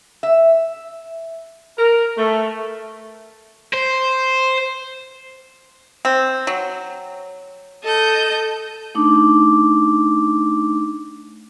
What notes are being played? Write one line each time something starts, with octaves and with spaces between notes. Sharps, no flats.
E5
A#4
A3
C5
C4
F#3
A4 D#5 G6
A3 D4 D#4 D6